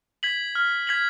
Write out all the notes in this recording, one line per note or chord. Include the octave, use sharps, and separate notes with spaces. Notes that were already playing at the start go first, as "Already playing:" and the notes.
G#6 B6 F#7
F6
G#6 B6 F#7